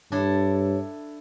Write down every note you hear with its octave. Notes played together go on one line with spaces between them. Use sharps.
G2 D4 E4 A4 C#5